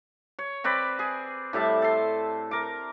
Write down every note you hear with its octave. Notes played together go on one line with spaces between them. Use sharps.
C#5
C4 B4 D5 B5
G#4
A2 G3 E5 A5
A4 C6
A#4 D6